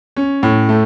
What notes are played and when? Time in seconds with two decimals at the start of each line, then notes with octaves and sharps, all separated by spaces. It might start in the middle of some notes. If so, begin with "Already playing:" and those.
0.17 C#4
0.43 A2
0.69 A3